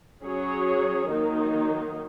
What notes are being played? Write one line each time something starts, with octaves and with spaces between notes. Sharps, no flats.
F#3 C#4 G#4 C#5
D#3 F#3 A#3 D#4